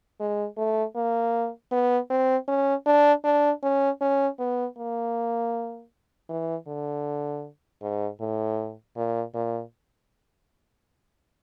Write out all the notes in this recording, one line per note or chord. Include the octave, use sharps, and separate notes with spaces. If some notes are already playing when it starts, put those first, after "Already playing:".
G#3
A3
A#3
B3
C4
C#4
D4
D4
C#4
C#4
B3
A#3
E3
D3
G#2
A2
A#2
A#2